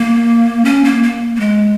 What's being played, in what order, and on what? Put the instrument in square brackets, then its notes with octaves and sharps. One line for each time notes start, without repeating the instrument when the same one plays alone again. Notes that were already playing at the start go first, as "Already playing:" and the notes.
Already playing: [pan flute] A#3
C#4
A#3
A#3
A#3
G#3